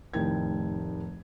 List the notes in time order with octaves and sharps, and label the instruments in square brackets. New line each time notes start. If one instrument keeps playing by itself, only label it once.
[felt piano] F1 A2 D#3 A#4 G5 G#6